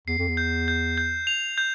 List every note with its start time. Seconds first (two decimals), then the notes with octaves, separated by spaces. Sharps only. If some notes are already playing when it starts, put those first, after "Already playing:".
0.07 E2 C7
0.18 F2
0.28 E2
0.37 G6
0.68 G6
0.98 G6
1.27 F7
1.58 G6